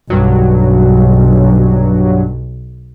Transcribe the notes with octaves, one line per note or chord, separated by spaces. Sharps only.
B1 G2 F#3